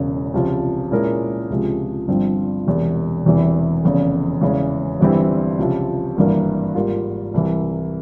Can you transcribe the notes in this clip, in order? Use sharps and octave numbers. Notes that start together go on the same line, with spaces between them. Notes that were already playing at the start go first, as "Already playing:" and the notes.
Already playing: E1 E2 C#3
C#2 C3 F3
A#2 G#3 C#4 E4 A#4
C#2 C3 F3 G#3
G1 G2 F3 C4
E1 E2 C3
E1 E2 C3 E3 G3
F1 E2 C#3
E2 C#3 E3 G#3 C#4
G1 G2 E3 G3 C4
C#2 C3 F3
G#1 G2 E3 A#3
G#2 G3 A#3 F4
C2 C3 E3